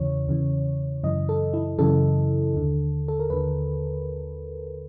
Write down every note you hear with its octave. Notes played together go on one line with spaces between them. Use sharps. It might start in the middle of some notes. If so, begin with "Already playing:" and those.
Already playing: E2 C#3 E3 C#5
E2 C#3 E3
F#2 C#3 E3 D#5
A4
E4
F#2 C#3 E3 A4
D#2 D3
A4
A#4
D#2 D3 B4